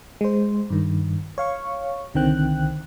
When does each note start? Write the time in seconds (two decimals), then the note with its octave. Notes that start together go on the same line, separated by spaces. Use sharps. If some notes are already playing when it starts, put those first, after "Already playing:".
0.21 G#3 C5
0.70 G2 D#3
1.38 C#5 F5 C#6
2.14 C2 D3 D#3 C4 G5 F#6